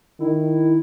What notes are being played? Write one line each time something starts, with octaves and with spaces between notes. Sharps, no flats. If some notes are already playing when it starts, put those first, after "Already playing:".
D#3 E4